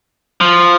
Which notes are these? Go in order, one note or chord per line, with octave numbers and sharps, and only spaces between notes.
F3